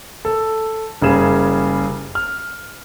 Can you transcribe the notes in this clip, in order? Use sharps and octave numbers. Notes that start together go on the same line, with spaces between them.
A4
F#1 C#3 G3 G#4 E7
F6